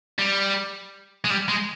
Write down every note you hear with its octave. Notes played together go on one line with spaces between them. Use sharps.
G3
G#3
G3
G#3